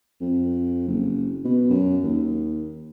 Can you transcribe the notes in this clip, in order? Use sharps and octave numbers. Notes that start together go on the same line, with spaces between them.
F2
F#1
B2
F#2
D#2